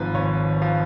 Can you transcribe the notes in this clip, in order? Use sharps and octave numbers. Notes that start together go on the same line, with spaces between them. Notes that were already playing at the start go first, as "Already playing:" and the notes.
Already playing: G#1 G#2 F3 B4
G#1 C#5
F3 F5